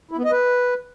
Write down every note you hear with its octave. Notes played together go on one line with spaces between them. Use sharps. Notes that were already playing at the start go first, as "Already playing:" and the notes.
E4
B3
D#5
B4